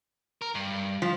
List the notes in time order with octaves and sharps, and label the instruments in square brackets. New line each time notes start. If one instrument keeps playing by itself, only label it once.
[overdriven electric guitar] A#4
G2
[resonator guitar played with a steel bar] F3